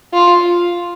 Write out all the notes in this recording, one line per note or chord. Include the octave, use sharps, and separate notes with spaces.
F4